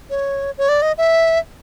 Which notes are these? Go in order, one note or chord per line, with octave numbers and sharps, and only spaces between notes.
C#5
C#5
D5
D#5
E5